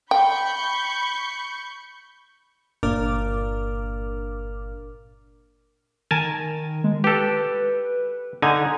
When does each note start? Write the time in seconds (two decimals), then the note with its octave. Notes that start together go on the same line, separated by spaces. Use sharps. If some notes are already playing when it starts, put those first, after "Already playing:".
0.11 G5 B5 C#6 G6
2.83 G1 A#2 D4 A#4 D6 F6
6.11 D#3 A#4 G#5 A5
6.84 G#3
7.04 G4 A4 B4
8.42 D3 D#4 G#5